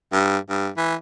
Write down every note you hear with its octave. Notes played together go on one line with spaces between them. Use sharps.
G2
G2
E3